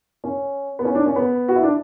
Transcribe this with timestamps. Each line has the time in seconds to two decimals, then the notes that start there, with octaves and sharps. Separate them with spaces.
0.24 C#4
0.79 B3
0.85 C#4
0.95 D4
1.06 C#4
1.16 B3
1.48 F#4
1.56 E4
1.63 D4